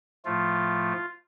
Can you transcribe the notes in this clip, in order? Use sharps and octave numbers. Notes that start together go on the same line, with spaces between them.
A2 F3 A3 F4